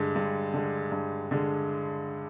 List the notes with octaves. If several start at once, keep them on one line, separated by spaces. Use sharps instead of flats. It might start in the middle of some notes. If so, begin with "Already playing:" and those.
Already playing: G2 D3 G#3
G2
D3 G#3
G2
D3 G#3